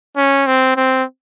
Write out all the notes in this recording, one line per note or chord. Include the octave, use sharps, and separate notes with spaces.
C#4
C4
C4